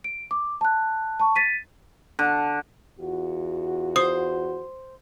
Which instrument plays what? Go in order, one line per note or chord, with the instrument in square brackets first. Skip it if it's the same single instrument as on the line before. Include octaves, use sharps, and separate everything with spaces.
[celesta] D7
D6
A5 F#6
A5 C#6
A6 B6 D#7
[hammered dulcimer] D3
[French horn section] E2 F4 F#4
[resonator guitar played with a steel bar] C5 [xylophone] D#6